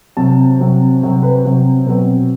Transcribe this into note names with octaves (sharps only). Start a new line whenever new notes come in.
C3 F#3 C4 A5
C3 F#3 C4
C3 F#3 C4
B4
C3 F#3 C4
B2 F#3 C4 B4